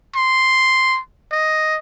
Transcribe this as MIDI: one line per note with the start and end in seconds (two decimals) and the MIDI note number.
0.15 0.99 84
1.32 1.78 75